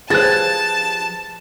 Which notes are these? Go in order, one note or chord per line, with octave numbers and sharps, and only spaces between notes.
F3 G4 G#4 B4 A5 F#6 A6